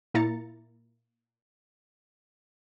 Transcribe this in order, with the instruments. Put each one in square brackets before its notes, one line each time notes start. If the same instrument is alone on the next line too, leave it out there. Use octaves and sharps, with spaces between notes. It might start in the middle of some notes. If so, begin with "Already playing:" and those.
[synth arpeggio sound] A#2 A#3 E4 A#5 A6 C#7